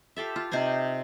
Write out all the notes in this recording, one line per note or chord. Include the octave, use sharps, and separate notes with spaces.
F4 G4 A4 E5
F4
C3 D#4 C5 G#5